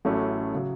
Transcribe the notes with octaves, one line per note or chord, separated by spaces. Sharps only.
A1 A2 F#3 A3 C#4
C#3 F#3